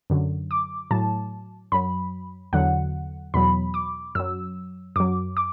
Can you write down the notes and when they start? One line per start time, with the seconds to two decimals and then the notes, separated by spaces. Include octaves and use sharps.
0.10 F#2 D3 F#3
0.51 D6
0.91 A2 F#3 A5
1.72 F#2 F#3 B5
2.53 E2 D3 F#3 F#5
3.34 E2 B2 F#3 B5
3.74 D6
4.15 F#2 F#3 E6
4.96 F#2 F#3 D6
5.37 D6